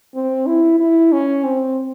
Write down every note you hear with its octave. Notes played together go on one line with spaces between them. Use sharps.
C4
E4
E4
C#4
C4